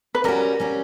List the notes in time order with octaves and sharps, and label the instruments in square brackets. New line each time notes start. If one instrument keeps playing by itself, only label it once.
[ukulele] B4
[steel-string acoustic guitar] G3 C#4 F#4 [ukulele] A#4
[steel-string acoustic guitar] G3 C#4 F#4